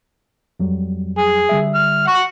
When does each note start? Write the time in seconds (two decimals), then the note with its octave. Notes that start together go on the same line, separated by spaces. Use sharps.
0.60 F2 F#3 G3
1.18 G#4
1.49 D3 G3 E5
1.75 F6
2.08 F#5 C#6